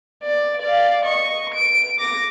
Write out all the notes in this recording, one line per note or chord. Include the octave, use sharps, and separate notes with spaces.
D5
D5 F5
D#5 C#6
D7
D6 A#6